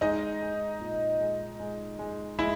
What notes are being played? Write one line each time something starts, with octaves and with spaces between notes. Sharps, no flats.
G#3 D#4 D#5
G#3
A#2
G#3
G#3
G#3
G#3 E4 E5